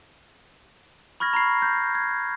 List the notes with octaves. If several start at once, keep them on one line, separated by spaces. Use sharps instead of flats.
B5 C#6 F6 G#6 A#6
A#5 B5 C7
G6
G#6